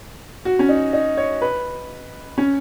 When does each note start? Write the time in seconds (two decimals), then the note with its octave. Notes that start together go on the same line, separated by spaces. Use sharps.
0.45 F#4
0.59 C#4
0.69 D#4
0.93 D#4
1.17 C#5
1.42 B4
2.38 C#4